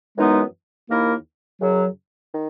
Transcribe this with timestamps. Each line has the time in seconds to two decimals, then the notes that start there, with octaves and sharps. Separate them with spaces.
0.17 F#2 E3 G#3 B3 D#4
0.89 D#2 D#3 A#3 E4 A#4
1.61 F#2 C#3 F#3
2.33 D#3